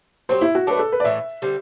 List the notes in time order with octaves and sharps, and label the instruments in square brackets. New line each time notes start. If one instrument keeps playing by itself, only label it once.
[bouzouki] F#3 C4 G4 [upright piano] C5
[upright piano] E4
F#4
[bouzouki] F#3 A3 D4 [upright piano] B4
[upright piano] A4
B4
D5
[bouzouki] A2 E3 A3 [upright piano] E5
[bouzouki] D3 G3 C4